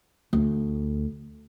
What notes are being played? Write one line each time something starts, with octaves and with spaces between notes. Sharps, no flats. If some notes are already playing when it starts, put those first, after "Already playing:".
D2